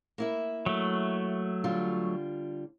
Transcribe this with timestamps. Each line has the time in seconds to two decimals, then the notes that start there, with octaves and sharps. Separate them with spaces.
0.18 A#3 E4 E5
0.66 F#3 A3
1.64 D3 G3 F4